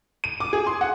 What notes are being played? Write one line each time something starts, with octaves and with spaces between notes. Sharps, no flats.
D#7
D6
G#4
C6
F#5